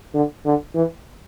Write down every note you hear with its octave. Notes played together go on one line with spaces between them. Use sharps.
D3
D3
E3